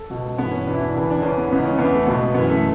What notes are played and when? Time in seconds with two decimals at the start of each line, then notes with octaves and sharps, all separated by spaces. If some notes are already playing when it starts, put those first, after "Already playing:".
Already playing: A4
0.10 C#2 B2
0.38 G2 E3 B3
0.52 C#4
0.67 E2 B2 D4
0.74 E4
0.81 D4
0.94 E2 C#3 E3
1.10 D4
1.22 E2 C#3 E3 C#4
1.37 B3
1.51 C#2 C#3 E3 B3
1.65 C#4
1.78 E2 D3 B3
1.93 A3
2.06 C#2 B2 B3
2.34 F#2 E3 B3
2.49 A3